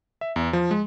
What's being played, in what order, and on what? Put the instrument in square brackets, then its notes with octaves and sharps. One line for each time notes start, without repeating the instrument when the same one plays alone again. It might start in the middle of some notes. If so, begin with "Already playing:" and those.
[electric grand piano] E5
E2
F3
G#3